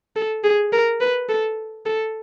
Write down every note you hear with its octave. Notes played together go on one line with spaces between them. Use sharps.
A4
G#4
A#4
B4
A4
A4